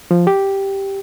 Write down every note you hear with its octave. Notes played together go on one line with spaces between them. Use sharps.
F3
G4